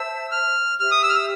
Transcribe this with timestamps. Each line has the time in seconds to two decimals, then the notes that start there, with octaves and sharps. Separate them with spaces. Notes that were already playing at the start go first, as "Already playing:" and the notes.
Already playing: C5 E5 A5 E6
0.31 F6
0.79 G4 C5 E5 F6
0.91 D#6
1.03 E6
1.09 F6
1.15 E6